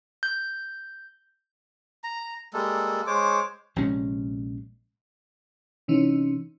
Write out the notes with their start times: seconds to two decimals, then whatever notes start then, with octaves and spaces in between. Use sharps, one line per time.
0.23 G6
2.04 A#5
2.53 G3 G#3 A#3 A4
3.07 G#3 C5 C#5 D6
3.76 A#1 C3 G#3 C#4
5.88 C3 E3 C#4 D#4